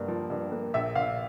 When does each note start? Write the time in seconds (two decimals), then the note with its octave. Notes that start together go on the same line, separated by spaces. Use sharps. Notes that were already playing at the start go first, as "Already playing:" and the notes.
Already playing: G2 A#3
0.08 F3
0.30 G2
0.52 A#3
0.74 A#1 E5
0.95 A#1 F5